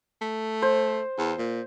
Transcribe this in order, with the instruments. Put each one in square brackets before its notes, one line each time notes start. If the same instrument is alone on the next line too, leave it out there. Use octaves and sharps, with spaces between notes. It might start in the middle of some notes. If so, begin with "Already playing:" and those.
[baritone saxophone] A3
[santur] C5
[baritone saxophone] E2
A#2